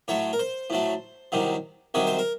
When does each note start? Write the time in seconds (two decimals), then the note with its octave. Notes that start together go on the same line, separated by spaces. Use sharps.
0.08 A2 F#3 A3 C#5
0.33 A#4
0.39 C5
0.70 A2 F#3 A3
1.32 C2 C3 D#3 F#3
1.94 C2 C3 D#3 F#3 C#5
2.07 C5
2.19 A#4